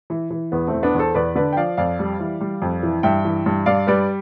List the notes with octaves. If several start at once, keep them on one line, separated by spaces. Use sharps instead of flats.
E3
E3
E2 B3
A3 C4
E2
B3 D4
E2 A4 C5
E2 B4 D5
D3 B4 D5
G5
F3 D5 F5
F2 D5 F5
G3
E3
G3
F2
E3
G2 E5 G5
E3
G2
G2 D5 F5
G3 B4 D5